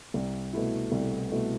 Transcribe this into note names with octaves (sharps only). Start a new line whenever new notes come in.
C2
B2 A3 E4
C2
B2 A3 E4